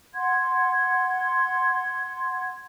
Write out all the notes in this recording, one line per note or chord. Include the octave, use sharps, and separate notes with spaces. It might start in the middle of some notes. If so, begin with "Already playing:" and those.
F#5 C6 G#6